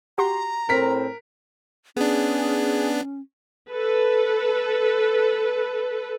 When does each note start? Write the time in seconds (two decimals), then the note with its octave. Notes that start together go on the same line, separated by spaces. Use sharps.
0.18 F#4 G4 A#5 C6
0.69 A2 C4 A#4 B6
1.96 B3 C#4 D4 G#4
3.71 A4 B4